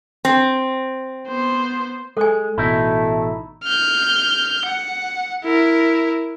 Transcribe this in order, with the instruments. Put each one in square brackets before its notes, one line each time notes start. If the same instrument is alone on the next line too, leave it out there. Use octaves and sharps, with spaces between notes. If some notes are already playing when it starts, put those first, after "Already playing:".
[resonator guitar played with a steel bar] C4
[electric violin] B3 C5
[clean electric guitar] G#3 [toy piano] A4 G#5
[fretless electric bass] A1 B2 [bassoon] A3 [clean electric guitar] D#4 E4
[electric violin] F6 G6
F#5
E4 A#4